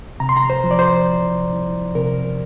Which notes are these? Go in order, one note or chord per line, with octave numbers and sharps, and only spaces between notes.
C3 A#5
C6
A#5
C5
F3
D5
C5
C2
C2
C3 A#4